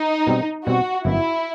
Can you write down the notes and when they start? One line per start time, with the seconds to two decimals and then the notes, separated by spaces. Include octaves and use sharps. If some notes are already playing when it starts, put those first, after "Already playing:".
Already playing: D#4
0.27 B2 G3 C4
0.66 B2 G3 C4 F#4
1.05 G1 F#2 E3 E4